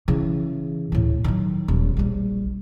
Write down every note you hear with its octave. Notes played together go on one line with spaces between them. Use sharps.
C#3 E3
D2 A2
D#3 F#3
D#1
A#1 G3